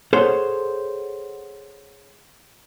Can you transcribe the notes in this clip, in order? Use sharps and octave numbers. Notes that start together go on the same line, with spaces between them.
G#4 A4 C5 C#5 F#5